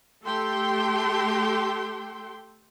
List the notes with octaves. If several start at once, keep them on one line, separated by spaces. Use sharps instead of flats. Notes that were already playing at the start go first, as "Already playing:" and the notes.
A3 G4 A4 G5 C6